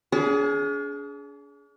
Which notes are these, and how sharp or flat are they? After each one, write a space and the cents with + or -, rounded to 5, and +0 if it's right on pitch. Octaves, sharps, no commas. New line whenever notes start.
D4 -45 G#4 +15